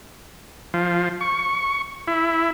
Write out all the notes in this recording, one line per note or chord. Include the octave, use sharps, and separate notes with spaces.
F3
C#6
E4